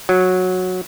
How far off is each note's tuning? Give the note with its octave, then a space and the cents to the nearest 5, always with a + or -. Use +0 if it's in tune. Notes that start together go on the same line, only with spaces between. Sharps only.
F#3 -10